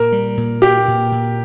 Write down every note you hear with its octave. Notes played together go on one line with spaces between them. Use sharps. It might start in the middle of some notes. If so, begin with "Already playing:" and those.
Already playing: A#2 A#4
G3
A#2
A#3 G4
A#2
A#2